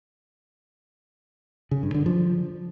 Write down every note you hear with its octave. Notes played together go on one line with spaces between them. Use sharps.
C#3
G2
D3
F3